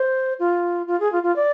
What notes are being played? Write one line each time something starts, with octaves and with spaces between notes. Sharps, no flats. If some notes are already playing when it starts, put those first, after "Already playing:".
Already playing: C5
F4
F4
G#4
F4
F4
D5